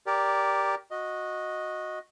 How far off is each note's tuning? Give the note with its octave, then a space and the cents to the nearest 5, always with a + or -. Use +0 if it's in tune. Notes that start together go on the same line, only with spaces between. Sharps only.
G4 +0 A#4 +0 D5 -15
F#4 -15 D#5 +0